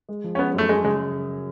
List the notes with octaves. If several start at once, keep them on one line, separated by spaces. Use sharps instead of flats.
G#3
F3
C#4
G#3 B3
F#2 A3
G#3 G#4
C#3 G#3